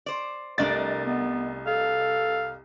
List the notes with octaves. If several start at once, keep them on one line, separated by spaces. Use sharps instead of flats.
C5 D5
C2 A3 D4 A#4 D#5 A6
B3
A4 F5